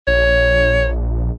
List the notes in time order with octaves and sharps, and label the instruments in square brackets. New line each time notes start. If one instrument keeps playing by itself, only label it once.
[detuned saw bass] A#1 [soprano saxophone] C#5